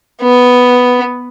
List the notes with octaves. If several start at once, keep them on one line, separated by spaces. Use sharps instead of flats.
B3